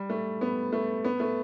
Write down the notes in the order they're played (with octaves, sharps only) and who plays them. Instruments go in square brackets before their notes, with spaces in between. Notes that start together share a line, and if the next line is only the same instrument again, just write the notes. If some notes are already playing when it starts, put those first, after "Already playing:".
Already playing: [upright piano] G3
A3
B3
A3
B3
A3